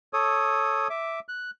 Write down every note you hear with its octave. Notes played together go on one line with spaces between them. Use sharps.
A4 C#5 D#6
E5 D6
F#6